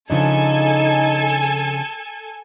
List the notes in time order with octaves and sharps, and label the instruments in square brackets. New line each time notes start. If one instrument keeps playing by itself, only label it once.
[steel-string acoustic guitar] C#3 F3 D4 [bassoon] D#4 [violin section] A4 G#5